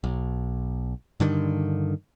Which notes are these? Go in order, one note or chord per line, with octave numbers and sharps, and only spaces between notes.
B1
G2 D3 D#3